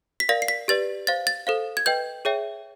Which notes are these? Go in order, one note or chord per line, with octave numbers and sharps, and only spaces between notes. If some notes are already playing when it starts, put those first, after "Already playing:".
B6
A#4 D5 F5 A#6
C7
B6
G4 B4 D5 A6
C5 F5 A6
A6
A4 C5 F5
G#6
B4 D#5 G5 G6
G#4 C#5 E5 G5